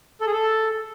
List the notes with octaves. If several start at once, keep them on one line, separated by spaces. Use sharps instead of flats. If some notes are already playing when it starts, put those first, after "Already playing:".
A4
G#4
A4